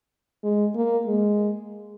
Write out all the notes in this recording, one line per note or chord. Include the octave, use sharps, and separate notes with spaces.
G#3
A#3
G#3